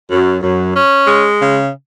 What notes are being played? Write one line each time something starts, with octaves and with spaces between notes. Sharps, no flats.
F#2
F#2
C#4
G#3
C#3